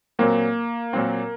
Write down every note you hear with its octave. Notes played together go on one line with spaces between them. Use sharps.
A#2 F#3 A#3 C4
A#2 F#3 C4